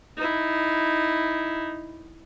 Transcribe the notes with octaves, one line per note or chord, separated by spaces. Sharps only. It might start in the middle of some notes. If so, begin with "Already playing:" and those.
D#4 E4